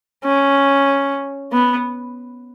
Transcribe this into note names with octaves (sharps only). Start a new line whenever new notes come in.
C#4
B3